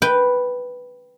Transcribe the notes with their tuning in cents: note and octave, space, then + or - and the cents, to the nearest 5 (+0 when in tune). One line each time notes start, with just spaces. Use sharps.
B4 +0 G5 +0